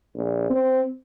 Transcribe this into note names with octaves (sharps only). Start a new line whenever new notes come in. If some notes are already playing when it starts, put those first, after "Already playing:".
A#1
C4